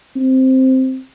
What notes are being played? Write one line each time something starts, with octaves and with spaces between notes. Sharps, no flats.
C4